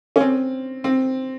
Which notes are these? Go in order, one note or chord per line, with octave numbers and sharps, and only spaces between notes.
C#4
C4
C4